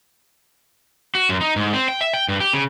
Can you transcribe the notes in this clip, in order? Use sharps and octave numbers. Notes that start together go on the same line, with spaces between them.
F#4
F#2
D#4
G#2
C4
G5
E5
G5
G2
G4
C#3